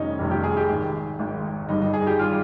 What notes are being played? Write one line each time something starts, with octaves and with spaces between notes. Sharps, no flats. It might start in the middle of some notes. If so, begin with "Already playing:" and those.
Already playing: F1 F2 D#3 G3 C#4 D#4
F1 F2 D#3 G3
G4
G#4
G4
G#1 G#2 D#3
G#1 G#2 D#3
G1 G2 G3 D#4
D#4
G#4
G4
G3 F4